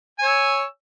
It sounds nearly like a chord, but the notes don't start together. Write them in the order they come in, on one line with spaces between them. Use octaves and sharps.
G#5 C#5 E6